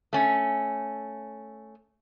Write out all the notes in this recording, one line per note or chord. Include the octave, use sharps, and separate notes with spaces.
A3 C#4